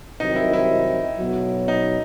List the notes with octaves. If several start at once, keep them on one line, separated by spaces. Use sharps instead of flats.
C2 C3 D#3 F#3 C4 D#4
E4
E4
B1 B2 F#3
D#4